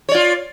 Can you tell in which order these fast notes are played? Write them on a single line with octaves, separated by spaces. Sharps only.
C#5 D5 F4